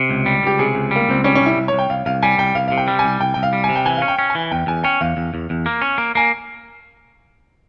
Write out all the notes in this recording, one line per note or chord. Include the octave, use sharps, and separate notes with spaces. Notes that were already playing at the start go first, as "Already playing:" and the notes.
Already playing: C3
C#2
G3
C#2 G4
C3 G#4
C#2
G3 A#3
C#2 C4
G3 C#4
C#4
C2
E4
C2
C2 C#5
G5
C2 F5
C2 F5
G3 G#5
C2 G5
C2 F5
C3 F5
G5
G3
G#5
C2
C2 G5
C2 G5
F5
G3
G#5
C3
G5
E3 G#5
C#4 F5
G5
C#4
G#5
E3
E2 G5
E2 G#5
C#4 G5
E2 F5
E2
E2
E2
A#3
C#4
A#3
A#3 G#5